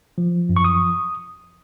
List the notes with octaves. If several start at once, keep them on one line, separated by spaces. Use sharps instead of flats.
F3
F#2
C#6
D#6